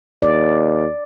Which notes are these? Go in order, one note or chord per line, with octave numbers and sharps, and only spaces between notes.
D#2 D5